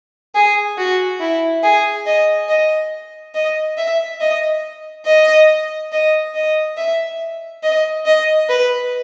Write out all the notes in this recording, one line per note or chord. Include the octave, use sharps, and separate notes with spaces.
G#4
F#4
E4
G#4
D#5
D#5
D#5
E5
D#5
D#5
D#5
D#5
E5
D#5
D#5
B4